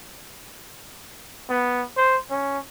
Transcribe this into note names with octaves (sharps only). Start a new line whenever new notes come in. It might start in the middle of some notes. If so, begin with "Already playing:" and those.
B3
C5
C#4